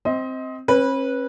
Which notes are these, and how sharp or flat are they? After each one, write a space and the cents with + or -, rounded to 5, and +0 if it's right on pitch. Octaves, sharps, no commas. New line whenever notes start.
C4 +0 D#5 +25
C#4 -45 B4 -15